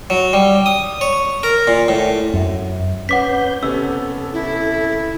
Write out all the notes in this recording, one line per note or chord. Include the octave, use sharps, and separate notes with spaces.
F#3
G3
D#6
C#5
A#4
A#2
A2
F#2
C#4 B4 F#5 D6 G6 B6
C3 B3 C#4 A4 E6
E4